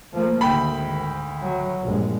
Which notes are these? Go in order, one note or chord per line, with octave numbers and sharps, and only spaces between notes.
F3 A3 A#3
D2 G#2 D#3 G5 B5
F#3
A#1 G2 G#3